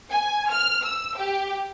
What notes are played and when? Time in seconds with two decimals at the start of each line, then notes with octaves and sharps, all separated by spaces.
0.10 G#5
0.50 F6
0.84 E6
1.17 G4